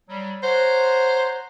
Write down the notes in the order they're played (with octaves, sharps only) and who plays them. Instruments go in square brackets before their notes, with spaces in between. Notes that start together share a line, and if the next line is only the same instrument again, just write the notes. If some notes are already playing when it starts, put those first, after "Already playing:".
[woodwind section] F#3 G3
[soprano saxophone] C5 [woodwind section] C#5 F#5 A#5